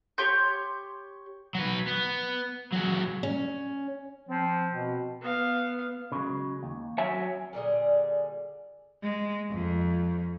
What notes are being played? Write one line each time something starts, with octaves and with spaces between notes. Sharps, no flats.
G4 C#5 C6 G6
F#3 B4
B3
F#3 G#3
C#4
F3 C4
B2
B3 F5
C#3 F#3 G#3
D#2
F#3 C#5 E5 G#5
A#2 D3 G3 G#4
G#3
F2